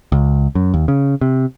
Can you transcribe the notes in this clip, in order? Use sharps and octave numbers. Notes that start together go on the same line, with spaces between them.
C#2
F#2
D#2
C#3
C3